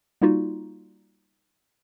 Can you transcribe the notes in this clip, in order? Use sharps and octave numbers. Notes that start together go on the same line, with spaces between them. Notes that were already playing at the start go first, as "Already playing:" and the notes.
G3 A#3 D#4 F4 F#4